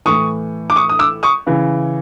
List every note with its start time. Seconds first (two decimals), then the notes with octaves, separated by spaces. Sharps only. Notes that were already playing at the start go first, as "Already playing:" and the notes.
0.05 A2 E3 C#6 D#6
0.70 D6
0.76 C#6 D#6
0.89 D#6
0.99 D6 E6
1.23 C#6 D#6
1.46 C#3 E3